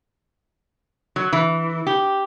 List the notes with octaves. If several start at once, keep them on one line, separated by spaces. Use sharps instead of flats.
F#3
E3
G4